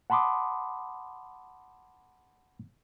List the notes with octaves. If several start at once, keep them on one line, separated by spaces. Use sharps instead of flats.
F#5 A5 B5 C6 D6 D#6